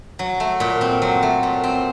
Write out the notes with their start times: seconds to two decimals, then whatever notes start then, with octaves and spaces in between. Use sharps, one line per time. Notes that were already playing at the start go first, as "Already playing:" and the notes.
0.19 F#3
0.40 A3
0.60 A#2
0.81 C4
1.02 F#3
1.23 A3
1.43 A#2
1.64 C4